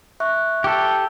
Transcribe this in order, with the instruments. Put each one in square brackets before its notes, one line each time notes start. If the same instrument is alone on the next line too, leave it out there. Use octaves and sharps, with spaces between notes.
[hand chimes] E5 C#6 F#6
[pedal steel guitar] G4 A4